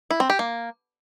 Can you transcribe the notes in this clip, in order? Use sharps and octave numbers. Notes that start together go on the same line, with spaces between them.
E4
C4
G4
A#3